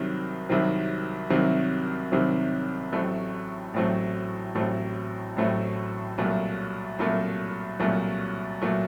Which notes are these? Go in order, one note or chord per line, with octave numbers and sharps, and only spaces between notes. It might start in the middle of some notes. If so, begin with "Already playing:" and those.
Already playing: C2 C3 D#3 F#3 C4
C2 C3 D#3 F#3 C4
C2 C3 D#3 F#3 C4
C2 C3 D#3 F#3 C4
A1 A2 F#3 A3 C4
A1 A2 F#3 A3 C4
A1 A2 F#3 A3 C4
A1 A2 F#3 A3 C4
C2 A#2 F#3 A3
C2 A#2 F#3 A3
C2 A#2 F#3 A3
A#2 F#3 A3